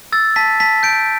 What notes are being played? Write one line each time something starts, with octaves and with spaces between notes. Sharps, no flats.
E6 A6
A5 B6
A5 B6
G6 D7